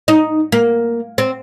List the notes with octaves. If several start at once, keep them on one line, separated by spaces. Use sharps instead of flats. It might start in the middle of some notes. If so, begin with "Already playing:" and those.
D#4
A#3
C4